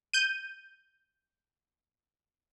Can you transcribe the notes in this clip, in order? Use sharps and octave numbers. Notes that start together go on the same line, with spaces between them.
G6 D#7